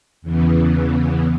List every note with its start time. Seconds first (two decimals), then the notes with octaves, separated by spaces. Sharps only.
0.22 E2 C#3 E3 B3